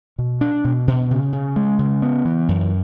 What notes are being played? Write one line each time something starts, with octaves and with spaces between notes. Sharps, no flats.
B2
D4
B2
B2
C#3
C#3
G#3
C#3
B3
E3
F#2